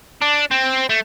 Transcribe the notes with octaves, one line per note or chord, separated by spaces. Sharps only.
D4
C4
A3